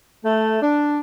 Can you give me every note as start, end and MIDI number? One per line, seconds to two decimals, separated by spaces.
0.24 0.58 57
0.61 0.99 62